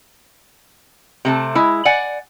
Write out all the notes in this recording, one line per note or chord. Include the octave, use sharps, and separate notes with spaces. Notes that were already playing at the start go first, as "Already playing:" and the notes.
C3 A3 A5
G#3 E4
D5 F#5 G#5